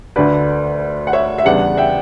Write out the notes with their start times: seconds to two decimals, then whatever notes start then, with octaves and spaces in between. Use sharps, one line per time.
0.16 D2 D3 A3 D4 B4 D5
1.07 F#5
1.13 C#5 E5
1.38 E5
1.45 E2 C#3 G3 B3 D4 D5 F#5
1.77 E5 G5